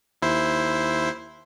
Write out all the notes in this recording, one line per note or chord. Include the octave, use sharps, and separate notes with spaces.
D#2 E4 C5